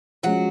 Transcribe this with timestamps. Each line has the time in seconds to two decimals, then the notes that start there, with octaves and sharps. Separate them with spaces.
0.23 F3 F#3 G#3 C#4 F#4